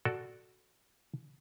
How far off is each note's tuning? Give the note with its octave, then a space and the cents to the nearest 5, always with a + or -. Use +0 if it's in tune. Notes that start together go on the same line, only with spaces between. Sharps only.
F#4 +0 A4 +0 D5 +0